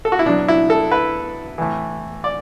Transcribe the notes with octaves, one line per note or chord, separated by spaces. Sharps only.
A4
F#4
E4
B2 F#3 D4
E4
A4
B4
A2 E3
D5